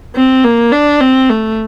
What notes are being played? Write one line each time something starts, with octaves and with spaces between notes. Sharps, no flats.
C4
A#3
D4
C4
A3